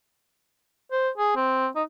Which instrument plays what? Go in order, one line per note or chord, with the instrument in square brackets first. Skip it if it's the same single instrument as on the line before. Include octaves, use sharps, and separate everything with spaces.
[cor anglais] C5
G#4
C4
D#4